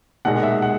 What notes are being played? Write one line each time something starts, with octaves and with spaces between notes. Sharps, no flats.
B1 A#2 G#3 F#5
E5
F#5